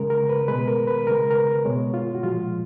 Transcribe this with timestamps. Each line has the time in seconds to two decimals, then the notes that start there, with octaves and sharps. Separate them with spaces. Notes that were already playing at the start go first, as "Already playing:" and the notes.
Already playing: C#3 G#3 A#4
0.10 A#4
0.29 B4
0.48 B2 G#3 B4
0.68 A#4
0.87 B4
1.07 C#3 G#3 A#4
1.31 A#4
1.36 B4
1.65 B2 G#3 C#5
1.94 F4
2.15 F#4
2.23 A#2 F3 G#3 F4